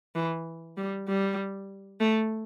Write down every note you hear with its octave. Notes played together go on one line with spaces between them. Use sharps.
E3
G3
G3
A3